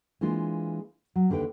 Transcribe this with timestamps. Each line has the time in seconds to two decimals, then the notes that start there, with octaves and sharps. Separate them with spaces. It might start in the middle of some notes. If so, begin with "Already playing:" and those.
0.21 E3 G#3 A#3 D4 F4
1.16 F#3
1.30 D#2 D3 G4 B4 G5